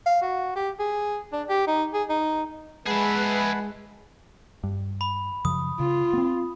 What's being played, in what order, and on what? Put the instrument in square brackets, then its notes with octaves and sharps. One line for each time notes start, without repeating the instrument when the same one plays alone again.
[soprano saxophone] F5
F#4
G4
G#4
D4
G4
D#4
G#4
D#4
[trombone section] G#3 [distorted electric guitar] G#4 E5 [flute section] B4 [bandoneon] F#5 A5 B5
[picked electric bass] G2
[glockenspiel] B5
[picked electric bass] F#2 C#3 F3 [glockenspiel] D#6
[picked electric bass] C#3 [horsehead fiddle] F4
[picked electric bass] B3 C4